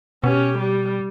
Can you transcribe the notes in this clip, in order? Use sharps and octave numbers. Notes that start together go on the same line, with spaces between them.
B2 C#4 G4
G3